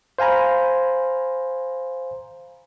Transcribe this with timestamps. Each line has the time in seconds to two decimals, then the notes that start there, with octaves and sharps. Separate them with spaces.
0.19 C5 F5 G#5 A#5 B5